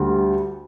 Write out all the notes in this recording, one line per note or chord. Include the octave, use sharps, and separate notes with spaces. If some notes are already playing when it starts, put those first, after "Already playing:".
Already playing: D2 D3 G3